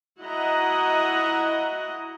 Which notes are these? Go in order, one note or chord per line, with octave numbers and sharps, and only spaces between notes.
E4 F#4 D#5 F#5 A#5